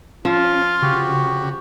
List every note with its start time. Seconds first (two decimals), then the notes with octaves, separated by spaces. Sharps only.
0.25 F3 C#4 F4
0.82 C#3 F#4 G4